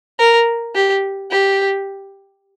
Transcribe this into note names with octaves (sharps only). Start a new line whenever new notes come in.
A#4
G4
G4